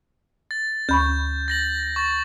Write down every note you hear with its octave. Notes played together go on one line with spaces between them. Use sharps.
A6
D2 B5 C#6 G6
A6 A#6 F#7
C#6 A6